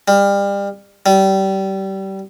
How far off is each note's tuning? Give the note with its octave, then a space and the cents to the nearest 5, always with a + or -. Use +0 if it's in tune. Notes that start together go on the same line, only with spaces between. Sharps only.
G3 +30
G3 -25